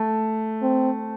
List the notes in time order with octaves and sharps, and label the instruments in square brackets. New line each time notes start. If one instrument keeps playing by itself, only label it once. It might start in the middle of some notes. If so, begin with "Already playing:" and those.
Already playing: [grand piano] A3
[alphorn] C4